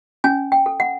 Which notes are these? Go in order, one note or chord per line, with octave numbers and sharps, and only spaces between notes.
C#4 G#5
G5
A4
F#5